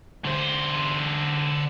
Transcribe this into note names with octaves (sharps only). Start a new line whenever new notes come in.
D3 C5